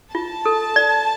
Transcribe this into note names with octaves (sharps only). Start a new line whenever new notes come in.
F4 A5
A4
D5